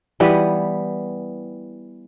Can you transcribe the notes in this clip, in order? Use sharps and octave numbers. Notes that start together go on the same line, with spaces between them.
E3 G3 B3